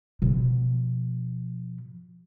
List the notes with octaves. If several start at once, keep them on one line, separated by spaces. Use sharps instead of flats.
B2 F3